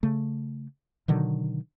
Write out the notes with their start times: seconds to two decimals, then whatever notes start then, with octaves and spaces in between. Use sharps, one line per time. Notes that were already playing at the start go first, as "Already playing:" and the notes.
0.03 C#3 A3
1.08 B2 D3 D#3 F#3